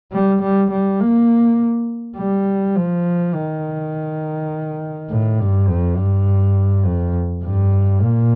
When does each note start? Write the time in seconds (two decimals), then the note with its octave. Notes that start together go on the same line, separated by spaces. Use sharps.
0.13 G3
0.43 G3
0.71 G3
1.00 A#3
2.17 G3
2.76 F3
3.34 D#3
5.10 A2
5.40 G2
5.69 F2
5.97 G2
6.85 F2
7.44 G2
8.02 A#2